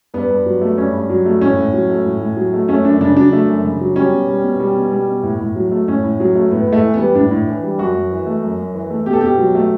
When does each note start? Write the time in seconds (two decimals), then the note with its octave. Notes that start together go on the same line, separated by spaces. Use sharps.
0.14 G2 B3
0.30 G2
0.46 F#3
0.62 A3
0.78 G2 C#4
0.93 G2
1.10 F#3
1.26 A3
1.41 A2 C#4
1.57 A2
1.73 F#3
1.90 A3
2.05 A2
2.21 A2
2.37 F#3
2.53 A3
2.68 A3 C#4
2.85 F#2 D4
3.01 C#3 D4
3.17 F#3 D4
3.33 A3
3.48 F#2
3.64 C#3
3.81 F#3
3.96 G3 C#4
4.12 B2
4.29 G3
4.44 B2
4.60 G3
4.76 B2
4.92 G3
5.08 B2
5.23 A2
5.40 A2
5.56 F#3
5.72 A3
5.88 A2 C#4
6.04 A2
6.20 F#3
6.36 A3
6.51 A2 B3
6.68 A2 A3
6.83 E3
6.94 B3
6.99 G3
7.15 A2 D4
7.31 A2
7.48 E3
7.63 G3
7.78 F#2 F#4
7.95 F#2
8.11 E3
8.26 A3
8.42 F#2
8.58 F#2
8.75 E3
8.90 A3
9.06 B2 G4
9.13 A4
9.21 B2 G4
9.38 F#3
9.55 A3